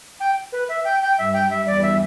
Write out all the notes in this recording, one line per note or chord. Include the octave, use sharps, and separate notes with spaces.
G5
B4
E5
G5
G5
G2 G3 E5
G5
E5
E2 E3 D5
E5